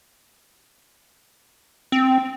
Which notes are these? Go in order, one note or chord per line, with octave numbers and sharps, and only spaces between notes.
C4